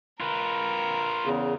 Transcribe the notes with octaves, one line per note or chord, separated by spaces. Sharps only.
F4 A#4 B4
E2 C#3